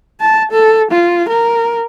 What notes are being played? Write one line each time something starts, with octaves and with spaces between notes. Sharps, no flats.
A5
A4
F4
A#4